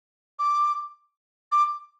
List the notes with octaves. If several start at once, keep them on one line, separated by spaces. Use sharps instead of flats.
D6
D6